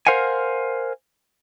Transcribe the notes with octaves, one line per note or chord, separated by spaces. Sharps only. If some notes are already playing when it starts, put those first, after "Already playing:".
A#4 C5 F5 F#5 G#5